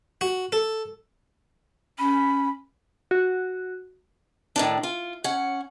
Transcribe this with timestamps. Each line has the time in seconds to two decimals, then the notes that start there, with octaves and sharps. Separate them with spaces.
0.21 F#4
0.52 A4
1.99 C#4 B5
3.11 F#4
4.56 A2 D#3 D4
4.83 F4
5.24 C#4 F#5